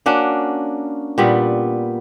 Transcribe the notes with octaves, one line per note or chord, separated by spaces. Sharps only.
A#3 C#4 D4 F#4
A#2 G3 B3